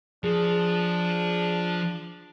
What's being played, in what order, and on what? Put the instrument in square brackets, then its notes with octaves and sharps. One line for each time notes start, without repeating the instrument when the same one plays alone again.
[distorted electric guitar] F3 [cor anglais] D4 [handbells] G#4